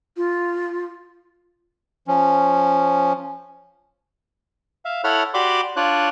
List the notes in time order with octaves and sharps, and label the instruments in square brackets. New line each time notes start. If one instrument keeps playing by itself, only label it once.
[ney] F4
[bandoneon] F3 C#4
[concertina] E5 F5
E4 A4 C#5 F#5 B5 F6
F#4 G4 D5 B5 C6 D6
D4 F4 C#5 D5 F#6